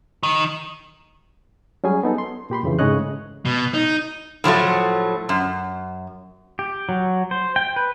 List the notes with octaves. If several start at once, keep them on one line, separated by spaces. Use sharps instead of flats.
D#3
F#3 G3 C#4 G#4 G#5
B3 D#4 A4
C6
A#2 G4 B5 C6
F2 C#3 E3
G#2 C#3 A3 C#5 D#5 F#6
B2
D#4
A2 F3 F#3 A3
F#2
G4
F#3
C5
G5
B4